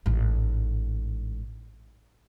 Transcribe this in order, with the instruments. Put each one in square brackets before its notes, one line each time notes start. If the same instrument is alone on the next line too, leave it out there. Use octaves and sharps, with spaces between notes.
[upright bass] A1 G#2